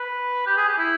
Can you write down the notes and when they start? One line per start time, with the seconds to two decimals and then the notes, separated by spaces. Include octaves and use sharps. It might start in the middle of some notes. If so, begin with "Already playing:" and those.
Already playing: B4
0.46 G4
0.57 G#4
0.68 G4
0.78 E4